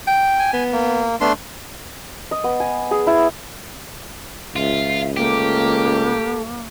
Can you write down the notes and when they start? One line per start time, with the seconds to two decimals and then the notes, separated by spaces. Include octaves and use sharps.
0.07 G5
0.39 G#5
0.53 B3
0.72 A#3
1.21 A3 B3 D4 C6
2.31 D#5
2.44 B3
2.60 G#5
2.91 G#4
3.07 E4
4.56 C#2 F4 E5
5.17 A3 A#3 G4